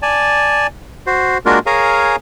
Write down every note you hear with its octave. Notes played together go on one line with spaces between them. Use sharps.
D5 G#5 A5
F#4 C5
G#3 A#3 D4 F4 F#4 A#4
G#4 A#4 C#5 F5 G#5 A#5